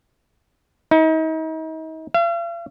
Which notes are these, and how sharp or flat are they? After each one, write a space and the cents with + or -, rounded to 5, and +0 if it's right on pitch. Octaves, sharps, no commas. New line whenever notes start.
D#4 +40
F5 -45